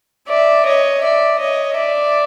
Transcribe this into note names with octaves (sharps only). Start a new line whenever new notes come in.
D5 E5
C#5 D#5
D5 E5
C#5 D#5
D5 E5